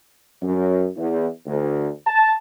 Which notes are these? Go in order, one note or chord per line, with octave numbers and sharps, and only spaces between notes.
F#2
E2
D2
A5